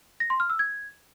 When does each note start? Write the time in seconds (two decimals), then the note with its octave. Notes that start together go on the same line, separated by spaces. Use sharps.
0.20 A#6
0.30 C6
0.40 F6
0.50 E6
0.59 G#6